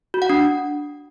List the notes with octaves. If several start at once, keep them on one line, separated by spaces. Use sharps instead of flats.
F#4
F#5
D4